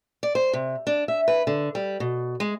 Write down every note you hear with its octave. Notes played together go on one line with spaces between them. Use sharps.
D5
C5
C3
D4
E5
B4
D3
G3
B2
G#3